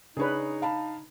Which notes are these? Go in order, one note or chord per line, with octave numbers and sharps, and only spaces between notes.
C#3 D4 D#4 G#4 B4 C#5
F5 A5 B5